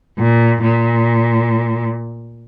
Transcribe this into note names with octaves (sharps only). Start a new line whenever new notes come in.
A#2
A#2